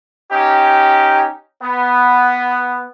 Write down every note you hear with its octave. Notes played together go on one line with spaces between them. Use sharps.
C#4 D#4 G4
B3